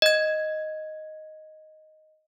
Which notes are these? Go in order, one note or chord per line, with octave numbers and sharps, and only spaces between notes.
D#5 G#6